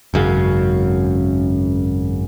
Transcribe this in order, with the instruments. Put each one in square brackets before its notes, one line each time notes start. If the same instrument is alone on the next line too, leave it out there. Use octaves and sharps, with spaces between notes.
[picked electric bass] G#1 F#2 C#3